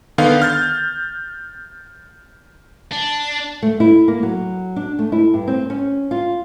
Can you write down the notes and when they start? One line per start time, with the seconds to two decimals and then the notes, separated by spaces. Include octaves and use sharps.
0.18 D3 D#3 B3 F5
0.42 F6 G6 A6
2.92 D4
3.63 A3
3.80 E4
4.08 A#3
4.23 F#3
4.76 D4
4.99 A3
5.12 E4
5.34 G2
5.47 C4
5.70 C#4
6.11 F4